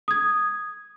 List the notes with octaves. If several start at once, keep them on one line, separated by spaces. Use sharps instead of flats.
D#6 G#6